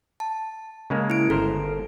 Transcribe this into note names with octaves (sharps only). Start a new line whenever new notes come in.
A5
C#3 G#3 A#3
E4 D7
G1 A4 A#4 C5